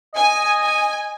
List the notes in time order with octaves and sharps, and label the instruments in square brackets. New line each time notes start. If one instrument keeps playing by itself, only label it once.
[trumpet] D#5 [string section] G#5
[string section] G#5